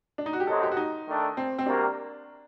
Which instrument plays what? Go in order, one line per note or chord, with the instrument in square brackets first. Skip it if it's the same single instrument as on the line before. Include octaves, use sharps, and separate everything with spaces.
[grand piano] D4
D#4
F#4
G4
[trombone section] F#2 F#3 C4 D#4 [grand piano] A4
[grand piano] G4
F#4
D#4
[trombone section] D#3 A3 D4
[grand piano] C4
C4
[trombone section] C3 G3 A#3 F#4 A#4 [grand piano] D4